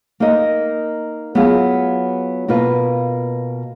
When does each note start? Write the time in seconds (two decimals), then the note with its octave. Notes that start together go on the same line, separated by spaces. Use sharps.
0.20 A#3 D#4 A#4 D#5
1.35 F#3 B3 F4 G#4
2.48 B2 A#3 F4 B4